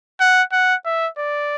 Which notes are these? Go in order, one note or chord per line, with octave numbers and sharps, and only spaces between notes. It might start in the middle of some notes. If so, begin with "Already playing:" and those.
F#5
F#5
E5
D5